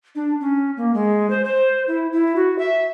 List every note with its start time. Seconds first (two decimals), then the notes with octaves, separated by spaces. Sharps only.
0.15 D4
0.41 C#4
0.77 A#3
0.94 G#3
1.30 C5
1.44 C5
1.88 E4
2.13 E4
2.36 F#4
2.59 E5